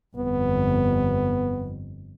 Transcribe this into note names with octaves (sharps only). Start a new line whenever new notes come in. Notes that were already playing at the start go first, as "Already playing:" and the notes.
G1 F2 B3